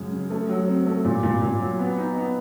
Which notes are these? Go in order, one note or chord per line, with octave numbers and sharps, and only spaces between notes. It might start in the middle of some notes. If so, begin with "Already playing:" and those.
Already playing: F#2 C#3 G#3
C#3
A3
F#3
C4
A3
A#2
A#2
A#2
F#3
B3
D#4
B3